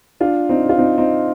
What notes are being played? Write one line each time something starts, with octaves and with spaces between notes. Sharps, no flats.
D4 F4
C4 D#4
F4
C4 D#4
C4 D#4